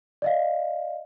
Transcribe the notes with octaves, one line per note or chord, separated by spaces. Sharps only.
D5 D#5 F5